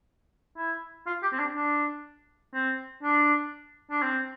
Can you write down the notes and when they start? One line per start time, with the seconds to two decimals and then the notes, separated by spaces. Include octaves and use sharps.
0.57 E4
1.06 F4
1.23 G4
1.33 C4
1.39 D4
1.56 D4
2.54 C4
3.03 D4
3.91 D4
4.02 C4